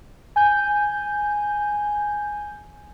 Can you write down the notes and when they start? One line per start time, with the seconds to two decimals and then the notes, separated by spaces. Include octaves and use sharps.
0.36 G#5 G6